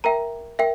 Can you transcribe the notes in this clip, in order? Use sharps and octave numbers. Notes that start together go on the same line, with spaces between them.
A#4 E5 G5 A#5
A#4 E5 G5